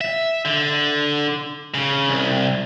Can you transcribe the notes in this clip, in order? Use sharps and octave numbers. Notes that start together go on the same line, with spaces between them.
E5
D3
C#3
C2